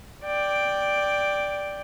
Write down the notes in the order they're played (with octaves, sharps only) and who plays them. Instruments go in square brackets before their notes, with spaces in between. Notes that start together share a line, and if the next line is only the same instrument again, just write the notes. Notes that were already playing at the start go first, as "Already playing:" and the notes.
[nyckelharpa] D5 G5